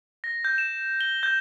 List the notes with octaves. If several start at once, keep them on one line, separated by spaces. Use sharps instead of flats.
A#6
G6
E7
G7
G6